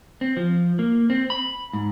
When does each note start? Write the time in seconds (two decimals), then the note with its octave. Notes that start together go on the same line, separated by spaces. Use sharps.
0.21 C4
0.37 F3
0.79 A#3
1.10 C4
1.30 B5
1.73 G#2